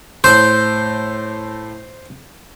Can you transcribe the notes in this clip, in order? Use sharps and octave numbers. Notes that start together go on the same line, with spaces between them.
A2 C5 G6